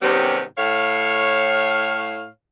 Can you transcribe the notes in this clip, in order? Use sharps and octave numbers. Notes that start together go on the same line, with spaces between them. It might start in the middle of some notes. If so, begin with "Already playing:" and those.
G#2 C3 D#3 G3 B3 C#4
A2 C#5 F5